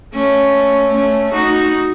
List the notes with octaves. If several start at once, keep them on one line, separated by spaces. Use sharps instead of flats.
A3 C#4
A3 C#4
D#4 F#4